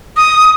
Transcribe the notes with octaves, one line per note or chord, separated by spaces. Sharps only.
D#6